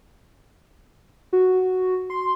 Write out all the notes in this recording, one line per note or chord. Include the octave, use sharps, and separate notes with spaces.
F#4
C6